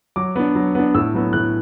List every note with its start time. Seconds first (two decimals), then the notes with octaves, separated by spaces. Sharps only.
0.16 F#3 D6
0.36 B3 D4
0.55 F#3
0.75 B3 D4
0.94 A2 E6
1.14 F#3 B3
1.33 A2 F#6